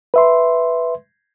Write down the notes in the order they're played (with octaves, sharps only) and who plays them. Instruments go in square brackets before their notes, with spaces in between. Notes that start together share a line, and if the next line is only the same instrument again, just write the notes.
[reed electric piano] B4 E5 C6